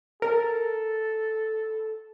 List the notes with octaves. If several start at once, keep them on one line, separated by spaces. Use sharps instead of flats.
A4 A#4